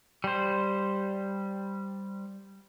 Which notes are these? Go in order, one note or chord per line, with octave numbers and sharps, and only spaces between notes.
G3 C5